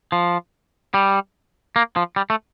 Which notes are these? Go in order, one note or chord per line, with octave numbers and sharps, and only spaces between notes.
F3
G3
A#3
F3
G3
A3